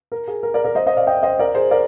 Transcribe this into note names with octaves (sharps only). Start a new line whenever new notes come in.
A#4
G#4
A#4
A#4 D5
A#4 D5
C5 D#5
C5 D#5
D5 F5
D#5 G5
C5 D#5
A#4 D5
G#4 C5
A#4 D5